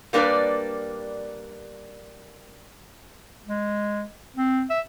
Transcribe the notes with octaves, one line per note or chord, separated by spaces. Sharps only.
G3 A#3 D4 A#4 B4 D5
G#3
C4
E5